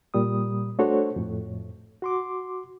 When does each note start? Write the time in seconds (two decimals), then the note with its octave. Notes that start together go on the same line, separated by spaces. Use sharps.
0.14 A#2 G3 D#6
0.79 A3 D4 F#4 A4 C5 C#5
1.16 F2 A2
2.02 F#4 C6 D6